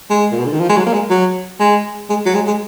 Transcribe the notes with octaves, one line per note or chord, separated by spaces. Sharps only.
G#3
A#2
B2
D3
D#3
F3
G#3
F#3
A#3
G#3
F#3
G#3
G#3
F#3
G#3
G#3